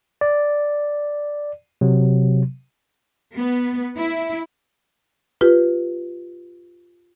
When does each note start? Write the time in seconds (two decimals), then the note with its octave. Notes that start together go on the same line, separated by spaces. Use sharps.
0.21 D5
1.81 C3 F#3
3.35 B3
3.96 E4
5.41 F4 G4 B4